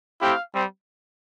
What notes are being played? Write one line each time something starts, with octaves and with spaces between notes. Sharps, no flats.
A3 C4 E4 G4 F5
G3 C4